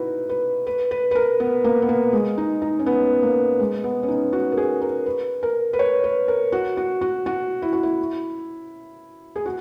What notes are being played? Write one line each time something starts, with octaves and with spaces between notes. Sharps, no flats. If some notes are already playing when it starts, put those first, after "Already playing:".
Already playing: D#4 E4 F#4 B4
B4
B4
B4
B4
A#4
B3
A#3
B3
A#3
G#3
D#4
D#4
C#4
B3
A#3
G#3
B3
C#4
D#4
F#4
A#4
G#4
A#4
B4
A#4
B4
C#5
B4
A#4
F#4
F#4
F#4
F#4
E4
F#4
E4
G#4
F#4